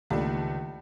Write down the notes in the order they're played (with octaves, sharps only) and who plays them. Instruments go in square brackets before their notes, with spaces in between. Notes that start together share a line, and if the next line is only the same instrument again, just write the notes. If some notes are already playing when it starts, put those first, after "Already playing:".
[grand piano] C#2 [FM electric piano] D#3 [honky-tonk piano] A3 D4 [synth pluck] A#3 F4 G4